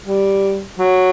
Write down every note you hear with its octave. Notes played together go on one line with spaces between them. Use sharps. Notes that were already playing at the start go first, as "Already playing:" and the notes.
G3
F#3